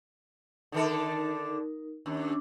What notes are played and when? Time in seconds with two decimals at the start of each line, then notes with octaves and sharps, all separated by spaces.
0.72 D3 D#3 D#4 A4 A#4
2.06 D#2 C#4 D4 E6